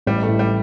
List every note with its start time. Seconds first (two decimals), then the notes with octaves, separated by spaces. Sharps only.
0.06 A1 G3
0.22 A3
0.28 A2
0.39 G3